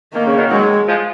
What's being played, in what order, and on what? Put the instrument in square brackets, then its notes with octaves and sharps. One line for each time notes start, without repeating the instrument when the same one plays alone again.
[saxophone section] D#3 [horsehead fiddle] A#3
[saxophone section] C#3
B2 D#3
[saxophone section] D#3 F#3 [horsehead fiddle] G#3
[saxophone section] F3 G#3